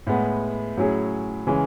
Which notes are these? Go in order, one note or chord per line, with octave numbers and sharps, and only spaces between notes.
A2 G#3 B3
A2 F#3 C#4 E4 G#4
C#3 E3 G#3 C#4